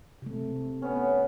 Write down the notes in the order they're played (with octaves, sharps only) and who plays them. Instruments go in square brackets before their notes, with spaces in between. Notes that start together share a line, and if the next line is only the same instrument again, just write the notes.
[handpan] C3 A3
[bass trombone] B3 [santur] C#4